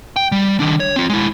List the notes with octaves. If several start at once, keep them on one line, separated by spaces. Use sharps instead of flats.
G5
G3
D#3 D4
C#5
C4 F4
G#3 E4